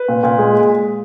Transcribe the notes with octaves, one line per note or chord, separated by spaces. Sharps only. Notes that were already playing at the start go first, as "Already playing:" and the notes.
Already playing: B4
A#2
A#2
G#3